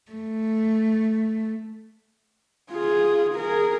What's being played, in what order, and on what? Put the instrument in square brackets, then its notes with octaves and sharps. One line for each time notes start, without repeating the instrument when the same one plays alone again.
[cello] A3
[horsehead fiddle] F4 G#4
G#4 A#4